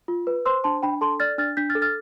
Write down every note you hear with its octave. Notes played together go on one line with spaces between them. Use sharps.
F4
B4
C5 C6 E6
D4 A5 C6
D4 G5 B5
A4 A5 C6
D5 F6 A6
D4 F6 A6
D4 G6 B6
F6 A6
A4
F6 A6